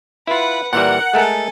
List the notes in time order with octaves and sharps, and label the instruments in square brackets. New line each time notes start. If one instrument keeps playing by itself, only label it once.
[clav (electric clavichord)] E4 F4 [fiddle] B4 F#5
[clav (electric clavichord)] A#2 E3 G3 [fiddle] A#4 [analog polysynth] F#5
[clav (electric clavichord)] G#3 A3 A#4 [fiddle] A4 G#5